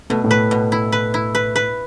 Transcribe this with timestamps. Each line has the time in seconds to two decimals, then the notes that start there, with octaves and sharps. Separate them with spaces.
0.10 B2 A3
0.24 A2 A3
0.31 B4
0.51 B2
0.72 E4
0.92 B4
1.14 E4
1.35 B4
1.56 B4